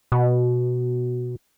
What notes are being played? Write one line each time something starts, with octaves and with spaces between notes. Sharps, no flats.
B2